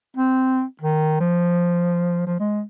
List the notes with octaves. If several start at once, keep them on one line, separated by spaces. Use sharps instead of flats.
C4
D#3
F3
F3
G#3